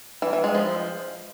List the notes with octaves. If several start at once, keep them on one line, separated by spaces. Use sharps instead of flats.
E3
E3
G#3
F3